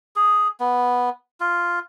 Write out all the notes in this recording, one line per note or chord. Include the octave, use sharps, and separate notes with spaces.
G#4
B3
F4